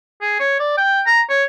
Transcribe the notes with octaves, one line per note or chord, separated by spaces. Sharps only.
G#4
C#5
D5
G5
A#5
C#5